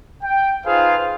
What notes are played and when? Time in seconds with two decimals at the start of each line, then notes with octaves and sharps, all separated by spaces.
0.24 G5
0.66 D#4 F4 G#4 B4 C5 F5